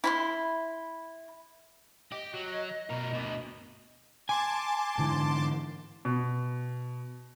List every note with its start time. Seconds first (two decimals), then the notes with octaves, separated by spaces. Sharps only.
0.04 E4 B5 C6
2.12 G4 D#5
2.34 F#3
2.90 B2 A#4
3.13 D2 B2
4.29 G#5 A5 C6 D6
4.98 G#2 D3 E3
6.05 B2